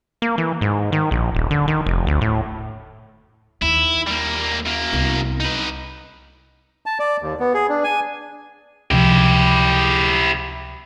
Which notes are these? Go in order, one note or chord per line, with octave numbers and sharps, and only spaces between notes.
A#3
E3
G#2
D#3
A#1
D#1
D3
D#3
F1
D2
A2
D#2 E4
G3 A#3
F#2 A#3
C2 B3
D#4 B4
A5
D5
D#2
B3
G#4
D4
G#5
C#2 C3 F3 E4 G4